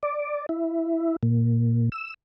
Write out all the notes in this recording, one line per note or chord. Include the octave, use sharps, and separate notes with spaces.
D5
E4
A#2
E6